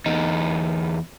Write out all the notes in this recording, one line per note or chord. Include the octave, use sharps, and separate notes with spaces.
E2 D#4